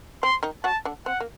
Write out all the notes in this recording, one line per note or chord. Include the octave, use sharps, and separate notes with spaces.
C4 C6
D#3 D#4
F#3 F#4 A5
D3 D4
C4 F#5
A#3